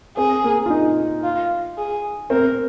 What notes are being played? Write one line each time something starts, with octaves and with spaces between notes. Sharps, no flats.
C4 G#4
A#3
F4
D#4
F4
G#4
C4 A#4